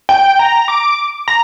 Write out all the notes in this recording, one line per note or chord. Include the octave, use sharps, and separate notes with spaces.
G5
A#5
D6
A#5